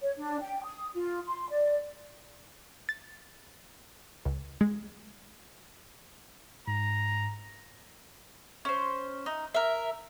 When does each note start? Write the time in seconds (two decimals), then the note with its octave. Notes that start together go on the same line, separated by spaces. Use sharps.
0.01 C#5
0.16 D4
0.41 G5
0.65 D#6
0.95 F4
1.27 C6
1.49 D5
2.89 A6
4.25 C#2
4.61 G#3
6.68 G#2 A#5
8.65 C#4 C5
9.26 D#4
9.54 A#4 E5